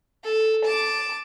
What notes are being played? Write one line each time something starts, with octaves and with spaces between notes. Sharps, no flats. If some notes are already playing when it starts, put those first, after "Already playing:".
A4
A5 D6